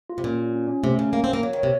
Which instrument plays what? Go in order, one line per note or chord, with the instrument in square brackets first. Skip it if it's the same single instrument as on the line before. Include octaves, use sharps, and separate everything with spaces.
[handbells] F4
[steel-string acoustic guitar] C3
[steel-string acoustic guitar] A#2 [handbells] C#4
[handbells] F4
C#4
C#4
[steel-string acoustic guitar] C3 [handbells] A3
[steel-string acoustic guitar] C#3 [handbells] C#4
[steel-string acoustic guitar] A#3 [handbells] F5
[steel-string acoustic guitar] C4
[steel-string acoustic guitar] A#3 [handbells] A#4
[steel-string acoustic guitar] F#3 [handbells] C#5
[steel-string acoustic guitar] D#3
[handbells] C#5
[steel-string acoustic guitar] C3